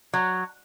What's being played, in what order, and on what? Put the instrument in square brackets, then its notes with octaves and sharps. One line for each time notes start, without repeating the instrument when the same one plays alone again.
[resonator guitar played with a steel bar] F#3